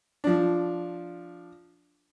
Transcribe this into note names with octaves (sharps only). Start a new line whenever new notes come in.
F3 D4